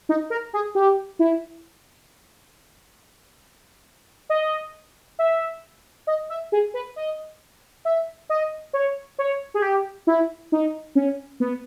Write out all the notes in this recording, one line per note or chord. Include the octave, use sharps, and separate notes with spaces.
D#4
A#4
G#4
G4
E4
D#5
E5
D#5
E5
G#4
B4
D#5
E5
D#5
C#5
C#5
G#4
G4
E4
D#4
C#4
B3